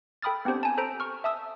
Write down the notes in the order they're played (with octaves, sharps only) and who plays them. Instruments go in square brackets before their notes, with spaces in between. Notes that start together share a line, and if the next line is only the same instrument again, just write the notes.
[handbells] A4 G5 B5 D#6 F6 A6
B3 C4 D4 G4 C5
G#5 A5
A4 C5 A#5 D7
C#6 F6
E5 A5 D#6 E6